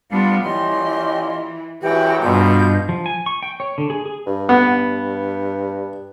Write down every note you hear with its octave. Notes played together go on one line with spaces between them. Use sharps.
G3 B3 D4 F4 F5
A#2 E3 C#4 G4 D#5 C6
G#1 C#2 F#2 E3 F#4 G4 G5
G2 B2 F4 G6
F3
G#5
C#6
G5
C#5
D3
G#4
G#4
G2
B3